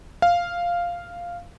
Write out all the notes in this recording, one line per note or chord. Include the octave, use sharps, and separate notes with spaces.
F5